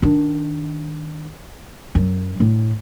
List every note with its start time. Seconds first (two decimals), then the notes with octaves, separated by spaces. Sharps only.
0.02 D#3 D4
1.95 F#2 F#3
2.40 A2 D3